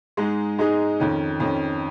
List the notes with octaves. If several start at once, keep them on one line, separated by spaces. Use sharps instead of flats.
G#2 G#3 D#4 G#4
G#2 G#3 D#4 G#4
F2 D#3 C#4
F2 D#3 C#4